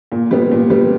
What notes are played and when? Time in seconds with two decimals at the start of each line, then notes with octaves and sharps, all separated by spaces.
0.12 A#2
0.31 G3 B3
0.51 A#2
0.70 G3 B3